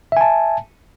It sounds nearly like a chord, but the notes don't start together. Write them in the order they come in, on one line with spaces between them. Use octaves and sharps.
E5 G#5 A5